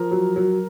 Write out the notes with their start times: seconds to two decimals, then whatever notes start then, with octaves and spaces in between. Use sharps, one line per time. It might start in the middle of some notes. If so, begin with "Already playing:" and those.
Already playing: F3 A#4
0.11 F#3
0.36 F#3